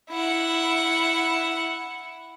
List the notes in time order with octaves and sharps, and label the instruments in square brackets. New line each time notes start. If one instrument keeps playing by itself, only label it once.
[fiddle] E4 F#5